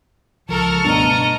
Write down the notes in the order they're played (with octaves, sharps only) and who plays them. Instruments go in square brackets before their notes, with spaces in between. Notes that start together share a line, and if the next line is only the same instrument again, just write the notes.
[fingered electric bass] C#2 F3 [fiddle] A4 A#4 [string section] A5 C#6 F6
[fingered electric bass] G2 B2 [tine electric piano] A3 B3 D4 [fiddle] D#5 A#5